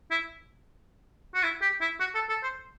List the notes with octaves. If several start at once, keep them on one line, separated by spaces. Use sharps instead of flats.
E4
F#4
E4
G4
E4
F#4
A4
A4
C5